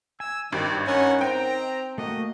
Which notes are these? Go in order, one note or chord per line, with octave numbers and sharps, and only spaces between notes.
G#5 E6
G#1 G2 D#3 D5 G5
C#4 D#4 A#4 F#5
C4 G5 A#5
A3 A#3 F#4 D#5